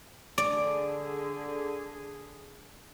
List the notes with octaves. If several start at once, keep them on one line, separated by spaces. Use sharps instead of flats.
D3 G#4 D5